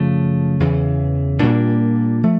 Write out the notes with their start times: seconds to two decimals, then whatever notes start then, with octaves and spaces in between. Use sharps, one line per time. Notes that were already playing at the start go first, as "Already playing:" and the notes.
Already playing: F#2 C#3 F3 A3
0.60 E2 C#3 E3
1.40 A#2 G3 A#3 D4
2.23 F3 A3